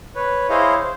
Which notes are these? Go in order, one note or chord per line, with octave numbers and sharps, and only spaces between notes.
B4 C#5
E4 G#4 C5 C#5 D#5 F5
C5